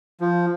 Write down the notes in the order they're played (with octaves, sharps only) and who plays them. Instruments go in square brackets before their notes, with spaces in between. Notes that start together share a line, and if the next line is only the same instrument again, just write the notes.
[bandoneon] F3